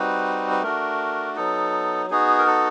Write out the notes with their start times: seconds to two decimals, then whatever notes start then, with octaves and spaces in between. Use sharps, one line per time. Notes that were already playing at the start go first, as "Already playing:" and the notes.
Already playing: G3 C4 D#4 F#4 B4
0.51 B4
0.62 A3 D4 F#4 A#4
1.36 F#3 B3 D#4 A4
2.10 B3 D#4 F#4 G#4
2.38 A#4
2.47 A4